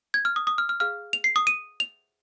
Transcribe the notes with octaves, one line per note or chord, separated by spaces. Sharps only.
G#6
F6
D#6
D#6
F6
F6
G#4 F5 F6
F7
C7
D#6
D#7
F7